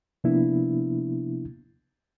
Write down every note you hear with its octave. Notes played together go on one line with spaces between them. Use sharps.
C3 F3 A#3 B3 D4 E4